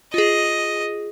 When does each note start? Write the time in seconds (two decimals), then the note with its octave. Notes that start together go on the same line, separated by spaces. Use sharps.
0.14 F4 G#4 D#5